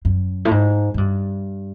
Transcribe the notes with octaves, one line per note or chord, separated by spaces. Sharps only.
F#2
A2
G#2
G#2
G2